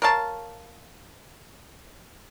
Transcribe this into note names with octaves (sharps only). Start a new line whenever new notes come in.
A#4 C#5 F5 A5